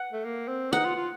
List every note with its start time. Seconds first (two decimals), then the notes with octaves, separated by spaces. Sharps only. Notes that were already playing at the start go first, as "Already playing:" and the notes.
Already playing: F#5
0.12 A3
0.25 A#3
0.48 C4
0.72 D#4 F#5
0.85 F4
0.96 F4